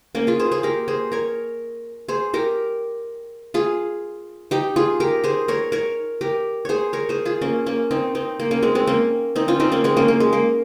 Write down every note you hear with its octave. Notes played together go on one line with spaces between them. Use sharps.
A#3 C#4
F4 G#4
G#4 C5
G#4 C5
G4 A#4
G#4 C5
A#4 C#5
G#4 C5
G4 A#4
F4 G#4
D#4 G4
F4 G#4
G4 A#4
G#4 C5
A#4 C#5
A#4 C#5
G4 A#4
G#4 C5 C#5
A#4 C#5
G#4 C5
F4 G#4
A#3 C#4
A#3 C#4
C4 D#4
C4 D#4
A#3
A#3 C#4
G#3 C4
G#3 C4
A#3 C#4
C4 D#4
C#4 F4
C4 D#4
A#3 C#4
G#3 C4
A#3 C#4
A#3
G#3
A#3